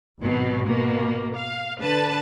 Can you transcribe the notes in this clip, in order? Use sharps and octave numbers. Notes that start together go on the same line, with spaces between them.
G#1 B2 F#3
B2 A#3
F5
D3 B4 A5